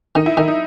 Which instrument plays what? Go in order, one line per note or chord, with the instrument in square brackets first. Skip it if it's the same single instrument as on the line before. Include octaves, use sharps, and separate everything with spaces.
[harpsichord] D#3 [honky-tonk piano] D#4
[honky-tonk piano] E4
[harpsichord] D#3 [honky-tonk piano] D#4
[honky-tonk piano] D#4